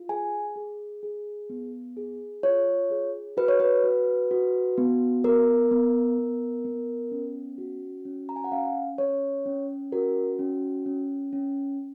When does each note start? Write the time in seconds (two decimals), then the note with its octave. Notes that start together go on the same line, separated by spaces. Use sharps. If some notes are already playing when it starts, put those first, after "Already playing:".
Already playing: F4
0.09 G#4 G#5
0.56 G#4
1.03 G#4
1.50 B3
1.97 G#4
2.43 F4 C#5
2.90 G#4
3.37 F#4 B4
3.48 C#5
3.60 B4
3.84 F#4
4.31 F#4
4.78 B3
5.24 B3 A#4
5.71 B3
6.18 B3
6.65 B3
7.11 C#4
7.58 F#4
8.05 C#4
8.29 A#5
8.36 G#5
8.44 F#5
8.52 C#4 F5
8.98 C#4 C#5
9.46 C#4
9.92 F#4 A#4
10.39 C#4
10.86 C#4
11.33 C#4